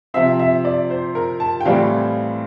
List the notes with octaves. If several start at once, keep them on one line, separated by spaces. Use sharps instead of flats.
C3 F3 C4 E5
E5
D5
C5
A#4
A5
G5
A2 E3 G3 C4 F5